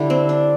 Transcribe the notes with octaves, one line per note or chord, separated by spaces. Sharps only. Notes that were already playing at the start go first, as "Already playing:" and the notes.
Already playing: D3 G3 E4
C4
D4